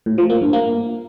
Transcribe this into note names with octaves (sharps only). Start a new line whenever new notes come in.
A2
F3
A#3
G2
A#3